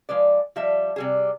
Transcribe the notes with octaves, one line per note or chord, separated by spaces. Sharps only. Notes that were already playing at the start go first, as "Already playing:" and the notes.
F3 G#3 B4 D5
F3 G3 D#5 E5
C3 G3 G#4